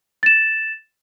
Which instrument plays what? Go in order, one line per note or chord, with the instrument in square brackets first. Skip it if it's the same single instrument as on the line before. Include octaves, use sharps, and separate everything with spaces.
[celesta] A6 E7